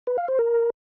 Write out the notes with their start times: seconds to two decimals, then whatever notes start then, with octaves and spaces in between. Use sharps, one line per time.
0.07 B4
0.18 F5
0.28 C5
0.39 A#4